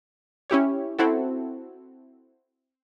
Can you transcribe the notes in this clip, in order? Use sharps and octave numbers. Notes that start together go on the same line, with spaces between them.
C#4 E4 G4 C#5
C4 E4 F#4 A4